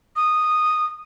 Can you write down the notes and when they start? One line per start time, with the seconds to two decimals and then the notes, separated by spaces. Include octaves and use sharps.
0.16 D#6